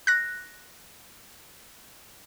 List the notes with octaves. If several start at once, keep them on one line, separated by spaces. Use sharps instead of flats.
F#6 A#6